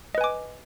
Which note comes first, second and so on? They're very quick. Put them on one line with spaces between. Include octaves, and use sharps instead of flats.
D#5 B4 G#5 D6